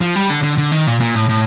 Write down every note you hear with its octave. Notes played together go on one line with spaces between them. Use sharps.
F3
G3
D3
D3
D3
D#3
A#2
A#2
A2
A2